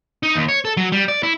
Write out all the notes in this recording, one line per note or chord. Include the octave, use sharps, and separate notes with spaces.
D#4
D#2
C#5
A4
F#3
G3
D5
E4